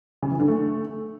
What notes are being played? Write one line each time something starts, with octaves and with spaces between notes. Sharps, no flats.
C#3
E3
D3
A3